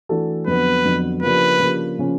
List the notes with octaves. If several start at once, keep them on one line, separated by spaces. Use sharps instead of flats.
E3 A3 D4 F#4 A4
F2 D3 F#3 B3 B4
F2 D3 F#3 B3
C#3 F3 A#3 D4 G4 B4
C#3 F3 A#3 D4 G4
C#3 F3 A#3 C#4